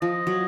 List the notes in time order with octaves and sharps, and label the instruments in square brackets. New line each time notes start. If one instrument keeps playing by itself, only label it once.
[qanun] F3 [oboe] D#5
[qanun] F#3